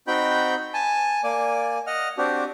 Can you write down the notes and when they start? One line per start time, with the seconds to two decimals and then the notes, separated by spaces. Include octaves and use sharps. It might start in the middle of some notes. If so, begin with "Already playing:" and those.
0.07 C4 D#4 F#4 G5 B5 G6
0.74 G#5 A5
1.24 A#3 D5 G#5
1.87 D#5 F#5 F6
2.18 C4 D4 F#4 G4